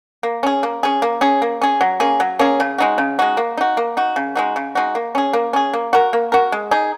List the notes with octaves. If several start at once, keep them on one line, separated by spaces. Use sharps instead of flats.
A#3
C#4 G#4
A#3
C#4 G#4
A#3
C#4 G#4
A#3
C#4 G#4
F#3
A#3 C#4 G#4
F#3
A#3 C#4 G#4
C#3
G#3 D#4 F#4
C#3
G#3 D#4 F#4
A#3
D#4 F#4
A#3
D#4 F#4
C#3
G#3 D#4 F#4
C#3
G#3 D#4 F#4
A#3
C#4 G#4
A#3
C#4 G#4
A#3
F#4 A#4
A#3
F#4 A#4
G#3
D#4 G#4